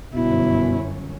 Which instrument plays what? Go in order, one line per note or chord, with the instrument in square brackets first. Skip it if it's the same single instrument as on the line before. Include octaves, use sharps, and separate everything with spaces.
[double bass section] G1 F#2 C#4 [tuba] B2 [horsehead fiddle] E4